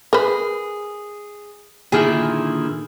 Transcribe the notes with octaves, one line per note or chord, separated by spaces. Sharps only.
G#4 A#4 B4
A#2 D3 D#3 E4 G#4